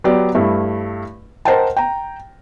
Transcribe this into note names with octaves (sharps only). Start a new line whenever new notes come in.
F#3 B3 G4 D5
G2 A3 E4
A#4 C5 D#5 F#5 G5 A5
G5 A#5